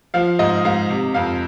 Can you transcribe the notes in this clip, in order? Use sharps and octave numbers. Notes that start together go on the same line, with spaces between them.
F3 F5
G#2 D#5
G#2 F5
C3
F2 F5